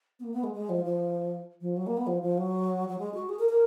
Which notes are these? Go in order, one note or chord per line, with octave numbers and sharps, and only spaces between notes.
B3
A#3
B3
G#3
G#3
F3
F3
F3
F#3
A#3
B3
F3
F3
F#3
F#3
G#3
F#4
G#4
A#4
A#4